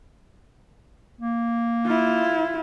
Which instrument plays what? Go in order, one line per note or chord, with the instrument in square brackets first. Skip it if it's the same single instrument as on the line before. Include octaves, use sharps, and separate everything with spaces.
[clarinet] A#3
[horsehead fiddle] E4 F4